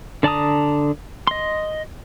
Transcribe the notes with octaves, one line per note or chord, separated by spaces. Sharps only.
D3 D5 A5 A#5 D#6
D#5 C6